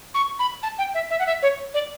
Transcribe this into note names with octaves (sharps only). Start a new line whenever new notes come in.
C#6
B5
A5
G5
E5
E5
F#5
E5
C#5
D5